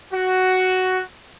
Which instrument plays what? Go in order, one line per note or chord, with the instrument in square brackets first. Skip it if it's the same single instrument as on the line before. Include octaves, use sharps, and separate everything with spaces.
[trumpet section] F#4